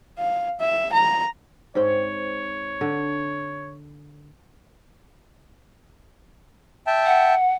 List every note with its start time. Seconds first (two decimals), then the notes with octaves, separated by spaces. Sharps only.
0.19 F5
0.60 E5
0.93 A#5
1.75 G#2 C4 C#5 G5
2.81 D3
6.87 E5 G5 A5
7.06 F#5